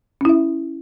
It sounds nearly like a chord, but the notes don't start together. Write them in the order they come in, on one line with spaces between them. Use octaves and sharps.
C#4 E4 E5